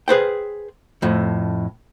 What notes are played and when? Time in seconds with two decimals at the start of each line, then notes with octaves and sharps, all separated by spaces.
0.08 G#4 B4 C5 G5
1.02 F2 A2